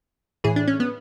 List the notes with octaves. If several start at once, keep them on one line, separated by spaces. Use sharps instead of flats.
A2 E3 G#4
D4
C#4
B3